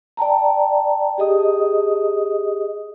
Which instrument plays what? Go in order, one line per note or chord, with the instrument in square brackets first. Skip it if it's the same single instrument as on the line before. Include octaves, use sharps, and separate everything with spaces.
[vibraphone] D5 G5 A5 A#5
G4 G#4 D#5 D#6